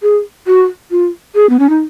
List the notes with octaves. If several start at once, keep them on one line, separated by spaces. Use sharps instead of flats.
G#4
F#4
F4
G#4
B3
C#4
D#4